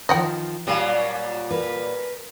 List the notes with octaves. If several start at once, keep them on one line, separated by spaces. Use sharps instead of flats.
D#3 F3 D#5 F#5 G5
A#2 F#3 G3 D4 F5
A#4 B4